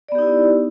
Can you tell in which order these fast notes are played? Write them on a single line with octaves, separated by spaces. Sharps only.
D5 B3 G4 D#4 E4